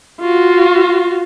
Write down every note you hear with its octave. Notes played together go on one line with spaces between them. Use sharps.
F4 F#4